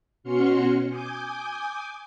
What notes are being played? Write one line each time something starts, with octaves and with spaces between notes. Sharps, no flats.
B2 C#4 F#4 C6 F6 C#7
G#5 D6 D#6 G6